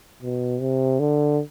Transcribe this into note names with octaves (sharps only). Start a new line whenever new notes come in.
B2
C3
D3